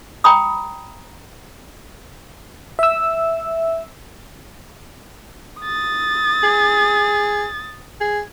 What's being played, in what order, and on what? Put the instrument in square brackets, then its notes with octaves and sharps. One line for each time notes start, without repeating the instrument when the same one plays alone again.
[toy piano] G5 A#5 B5 D#6
[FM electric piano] E5 E6
[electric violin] D#6 A6
[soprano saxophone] G#4
G#4